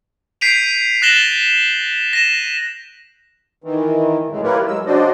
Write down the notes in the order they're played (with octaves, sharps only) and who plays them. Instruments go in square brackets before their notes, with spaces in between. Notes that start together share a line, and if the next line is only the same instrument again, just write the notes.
[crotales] G6 B6 C7 D7 D#7 F7
F#6 A6 A#6 E7 F#7 G7
A#6 D#7 E7
[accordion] D#3 E3
F#2 A2 C#3 G#3 A3
E4 F4 G4 A#4 B4 C#5
F#3 G#3 E6
C#3 D4 F#4 C5 D5 D#5